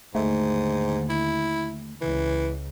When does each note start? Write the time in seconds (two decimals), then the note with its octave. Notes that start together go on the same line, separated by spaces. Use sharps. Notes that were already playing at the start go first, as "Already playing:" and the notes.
0.15 D#2 G#2 D3 A3
1.10 E4
2.01 C#2 E3